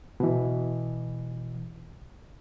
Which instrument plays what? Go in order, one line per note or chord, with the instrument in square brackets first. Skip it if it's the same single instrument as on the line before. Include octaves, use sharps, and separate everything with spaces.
[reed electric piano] B2 E3